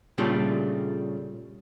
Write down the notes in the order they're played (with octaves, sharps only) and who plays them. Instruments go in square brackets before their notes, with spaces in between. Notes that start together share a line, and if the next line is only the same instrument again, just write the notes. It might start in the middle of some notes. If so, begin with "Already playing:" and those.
[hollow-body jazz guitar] A#2 C#3 G3 A3 D4 F4